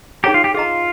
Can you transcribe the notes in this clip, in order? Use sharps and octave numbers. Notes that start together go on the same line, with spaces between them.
D#4 G4 G#4 C#5 G5 A#5
F4
G4
F4 G#4 D#5 A#5